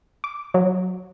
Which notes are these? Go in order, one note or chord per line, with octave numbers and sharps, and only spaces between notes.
D6
F#3